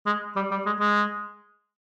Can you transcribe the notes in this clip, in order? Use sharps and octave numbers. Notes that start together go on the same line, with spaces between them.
G#3
G3
G3
G#3
G#3